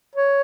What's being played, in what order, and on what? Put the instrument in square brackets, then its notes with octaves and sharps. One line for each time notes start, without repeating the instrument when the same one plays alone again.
[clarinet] C#5